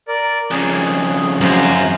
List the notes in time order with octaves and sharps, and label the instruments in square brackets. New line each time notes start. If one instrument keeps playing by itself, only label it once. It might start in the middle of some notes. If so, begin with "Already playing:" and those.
[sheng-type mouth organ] A#4 D5
[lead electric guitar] F2 C#3 [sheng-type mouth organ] G#4
[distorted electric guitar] F#2 [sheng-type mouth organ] C5 F5 A#5